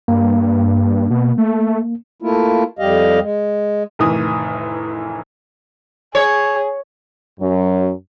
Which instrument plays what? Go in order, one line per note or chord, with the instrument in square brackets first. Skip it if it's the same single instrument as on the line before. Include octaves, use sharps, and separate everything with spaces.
[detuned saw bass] G2 [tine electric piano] A#3
[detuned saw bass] B2
A3
[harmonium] A3 A#3 E4 F4
F2 G3 G4 D#5 F5
G#3
[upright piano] F1 A2 D#3 E3 D#6
[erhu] G#4 [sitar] C#5
[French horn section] F#2 F#3